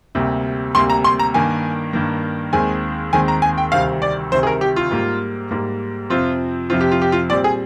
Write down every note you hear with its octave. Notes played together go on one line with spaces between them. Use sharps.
D2 C3 G3 A#3
D2 C3 G3 A#3 C6
A#5
C6
A#5
G2 D#3 A#3 G#5
G2 D#3 A#3
D#2 D#3 G#3 C4 G#5
D#2 D#3 G#3 C4 G#5
A#5
G#5
G5
D2 C3 D#3 G3 C4 F5
D5
D2 C3 D#3 G3 C4 C5
G#4
A#4
G4
F4
G#2 G3 A#3
G#2 G3 A#3
F2 C3 F3 C4 F4
F2 C3 F3 C4 F4
G4
F4
G4
F4
A#2 G3 C4 D5
G#4